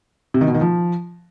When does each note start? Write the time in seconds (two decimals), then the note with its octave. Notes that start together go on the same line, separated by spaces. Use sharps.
0.34 C3
0.41 D#3
0.48 B2
0.54 D#3
0.61 F3